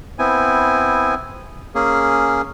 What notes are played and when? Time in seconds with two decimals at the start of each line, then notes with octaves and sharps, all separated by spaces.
0.19 B3 C4 E4 G#5
1.75 A#3 C#4 G#4